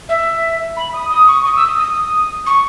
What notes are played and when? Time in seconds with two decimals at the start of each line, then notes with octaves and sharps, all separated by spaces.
0.08 E5
0.76 B5
0.93 D#6
1.10 D#6
1.27 C#6
1.44 D#6
1.55 E6
1.67 D#6
1.78 D#6
2.46 C#6